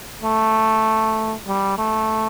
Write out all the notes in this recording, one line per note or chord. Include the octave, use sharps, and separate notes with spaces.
A3
G3
A3